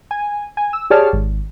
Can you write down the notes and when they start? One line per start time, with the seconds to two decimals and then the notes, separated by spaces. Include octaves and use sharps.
0.11 G#5
0.57 G#5
0.73 E6
0.90 G4 G#4 C#5 D5 A5 F6
1.13 G#1